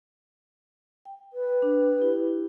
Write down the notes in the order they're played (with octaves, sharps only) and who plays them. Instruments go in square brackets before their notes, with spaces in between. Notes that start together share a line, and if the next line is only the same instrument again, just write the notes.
[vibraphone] G5
[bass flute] B4
[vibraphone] D4
E4 G4